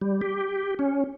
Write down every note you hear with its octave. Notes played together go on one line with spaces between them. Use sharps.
G3
G4
C#4